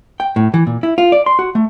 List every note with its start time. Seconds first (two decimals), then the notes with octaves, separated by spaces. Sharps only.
0.20 G5
0.36 A2
0.54 E3
0.67 A#2
0.83 E4
0.98 F4
1.12 D5
1.26 C6
1.39 F#4
1.55 A3